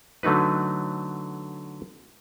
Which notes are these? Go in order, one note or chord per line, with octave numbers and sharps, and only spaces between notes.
D3 F#3 A3 D#4 B4